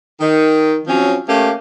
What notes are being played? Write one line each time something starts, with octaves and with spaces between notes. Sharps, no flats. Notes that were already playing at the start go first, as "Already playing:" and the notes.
D#3
F3 F#3 C4 C#4
A3 A#3 C#4 G4